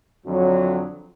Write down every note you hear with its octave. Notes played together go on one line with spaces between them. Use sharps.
F2 D3 F#3